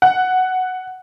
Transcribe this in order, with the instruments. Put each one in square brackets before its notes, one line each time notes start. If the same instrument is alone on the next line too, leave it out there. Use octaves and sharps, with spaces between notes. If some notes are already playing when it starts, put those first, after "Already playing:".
[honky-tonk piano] F#5